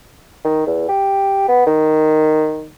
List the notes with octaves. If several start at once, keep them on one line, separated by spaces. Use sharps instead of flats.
D#3
E2
G4
B3
D#3